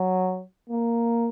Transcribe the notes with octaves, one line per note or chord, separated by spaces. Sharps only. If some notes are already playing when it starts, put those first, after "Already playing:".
Already playing: F#3
A#3